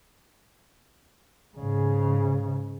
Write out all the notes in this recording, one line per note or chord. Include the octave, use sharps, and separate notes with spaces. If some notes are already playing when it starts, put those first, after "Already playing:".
G#2 C#3